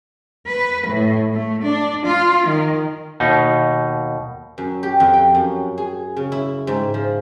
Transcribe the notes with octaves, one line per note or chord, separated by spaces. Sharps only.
B4
A2
A3
D4
F4
D#3
D#2 B2 D#4
F#2
G4
F2
G5
F#2
G#4
C#3
E4
G#2
F3